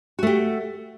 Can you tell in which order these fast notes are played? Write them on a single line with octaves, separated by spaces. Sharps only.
F#4 A3 G4